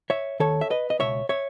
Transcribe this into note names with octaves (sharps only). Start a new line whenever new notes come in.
C#5 E5
D#2 D#3 A4 C#5
E5
B4 D#5
D#5
C#2 B2 C#5 E5
C#5 E5